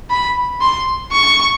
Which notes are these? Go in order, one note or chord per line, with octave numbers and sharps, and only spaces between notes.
B5
C6
C#6